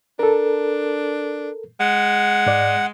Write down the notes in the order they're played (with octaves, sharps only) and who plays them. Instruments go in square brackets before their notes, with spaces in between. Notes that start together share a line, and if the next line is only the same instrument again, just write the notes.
[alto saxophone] D4 [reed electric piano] A4 A#4
[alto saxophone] G#3 [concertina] F#5
[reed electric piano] G#2 D5